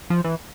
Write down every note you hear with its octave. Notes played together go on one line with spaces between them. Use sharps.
F3
E3